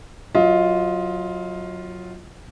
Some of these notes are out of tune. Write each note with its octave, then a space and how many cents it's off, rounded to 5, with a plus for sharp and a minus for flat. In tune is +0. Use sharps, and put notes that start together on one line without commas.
F#3 -10 F4 +0 D#5 +30